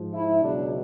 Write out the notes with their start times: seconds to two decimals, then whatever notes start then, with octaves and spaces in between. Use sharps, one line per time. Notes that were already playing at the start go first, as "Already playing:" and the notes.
Already playing: G#2 F3
0.13 E4
0.41 C#2 B2 F#3 D4